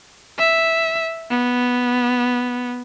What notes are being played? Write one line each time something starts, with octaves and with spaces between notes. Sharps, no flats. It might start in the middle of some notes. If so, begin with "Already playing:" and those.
E5
B3